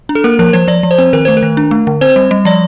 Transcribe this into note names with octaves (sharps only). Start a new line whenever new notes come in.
D4
A4
A#3 A#4
F3 A#4
F3 C5
F3 D5
F3
C5
C4
D#3 A#4
A3 C5
A#4
D#3
D4
A3
D3
C4 C5
G3
G3
F3 D5